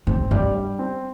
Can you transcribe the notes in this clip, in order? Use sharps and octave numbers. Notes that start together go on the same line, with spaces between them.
G#2 C4
G2 G3
G3
C4